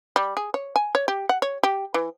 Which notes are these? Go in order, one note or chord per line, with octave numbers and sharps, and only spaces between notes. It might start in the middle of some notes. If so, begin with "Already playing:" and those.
G3
G#4
C#5
G#5
C#5
G4
F#5
C#5
G4
E3